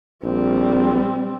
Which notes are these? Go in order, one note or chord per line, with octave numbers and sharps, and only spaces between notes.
A#1 G3 C4